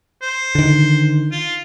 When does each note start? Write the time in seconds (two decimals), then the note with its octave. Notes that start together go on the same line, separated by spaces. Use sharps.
0.22 C5
0.55 D3 D#3
1.32 F4